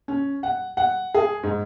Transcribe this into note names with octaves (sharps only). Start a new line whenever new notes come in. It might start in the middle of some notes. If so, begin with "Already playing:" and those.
C#4
F#5
F#5
G#4
G#2